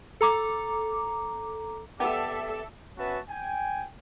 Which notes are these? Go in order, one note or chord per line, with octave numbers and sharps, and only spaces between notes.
A4 A#5 D6
B3 G4 A4 D5 E5
B3 C#4 F#4 B4 E5 A5
G5 G#5